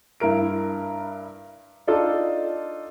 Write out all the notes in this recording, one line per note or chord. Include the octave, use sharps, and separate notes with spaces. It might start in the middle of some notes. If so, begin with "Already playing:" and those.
G2 E4 A#4 D7
D4 D#4 F4 A4